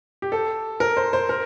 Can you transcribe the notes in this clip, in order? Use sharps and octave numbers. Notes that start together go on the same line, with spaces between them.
G4
A4
A#4
C5
C5
A#4